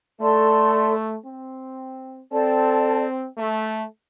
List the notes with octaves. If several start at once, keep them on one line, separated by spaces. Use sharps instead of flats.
A3 A4 D5 A5 C6
C4
C4 A4 D5 A5
A3